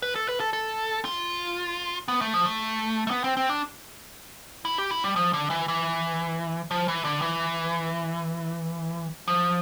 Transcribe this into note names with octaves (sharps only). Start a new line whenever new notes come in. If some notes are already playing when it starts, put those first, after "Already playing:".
B4
A4
B4
A4
A4
F4
B3
A3
F3
A3
A3
B3
C4
C4
D4
E4
G4
E4
G3
F3
D3
E3
E3
F3
E3
D3
E3
F3